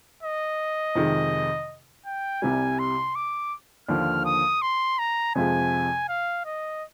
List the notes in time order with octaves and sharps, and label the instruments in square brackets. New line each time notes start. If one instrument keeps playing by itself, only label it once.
[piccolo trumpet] D#5
[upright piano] F2 C3 D#3 G#3
[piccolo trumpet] G5
[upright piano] C2 C3 G3 [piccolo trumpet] G#5
[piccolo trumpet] C6
D6
[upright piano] D#2 D3 F3 [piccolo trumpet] F6
[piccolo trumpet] D#6
C6
A#5
[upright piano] F2 C3 F3 G#3 [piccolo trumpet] G#5
[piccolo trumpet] F5
D#5